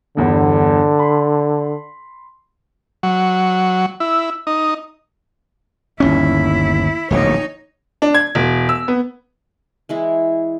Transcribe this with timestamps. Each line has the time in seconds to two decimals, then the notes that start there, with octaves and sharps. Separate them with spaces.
0.17 G1 E2 G2 D3
0.99 B5 C6
3.03 F#3
4.00 E4
4.47 D#4
6.00 G1 D#2 C#4 E4
7.10 D1 A#1 B2 D#4 C#5
8.02 D4
8.14 G#6
8.35 E1
8.69 E6
8.88 B3
9.89 E3 G#3 E4